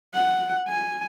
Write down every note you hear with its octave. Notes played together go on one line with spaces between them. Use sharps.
F#5
G#5